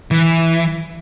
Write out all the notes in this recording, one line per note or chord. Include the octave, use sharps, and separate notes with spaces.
E3